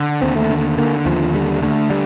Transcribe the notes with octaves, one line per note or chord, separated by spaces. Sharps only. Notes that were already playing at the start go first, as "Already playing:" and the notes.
Already playing: D3
D#2 C4
A3
D3
D3 A#3
D#2 F3
D3 G3
D3 A3
G3